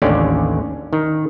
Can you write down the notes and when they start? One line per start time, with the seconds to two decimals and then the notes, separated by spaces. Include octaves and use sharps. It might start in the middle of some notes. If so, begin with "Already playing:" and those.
0.02 A1 D#2 D3 C#4 D5
0.93 D#3